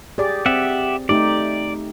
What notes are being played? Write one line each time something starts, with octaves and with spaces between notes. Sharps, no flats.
G4 G#4 D5
C4 G4 E5 F#5
A3 D#4 G4 D5